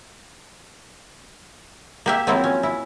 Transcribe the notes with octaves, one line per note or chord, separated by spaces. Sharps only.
A#3 G4 E5
F3 F#3 A#3 C4 E4
C#4
E4